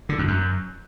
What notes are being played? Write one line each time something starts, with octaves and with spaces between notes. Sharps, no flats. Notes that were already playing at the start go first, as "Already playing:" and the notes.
D3
F2
F#2